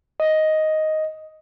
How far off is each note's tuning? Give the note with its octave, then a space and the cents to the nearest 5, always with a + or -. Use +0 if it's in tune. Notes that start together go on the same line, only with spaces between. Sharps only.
D#5 +5